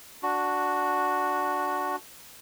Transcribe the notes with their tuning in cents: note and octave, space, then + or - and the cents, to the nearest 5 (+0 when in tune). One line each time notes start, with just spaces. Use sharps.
D4 +0 F#4 +0